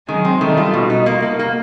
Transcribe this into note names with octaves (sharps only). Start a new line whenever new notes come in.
D#3 F#3 G#3
C4
D#3 G3 A3
F4
B2
D#4
A#3
A#3
A#3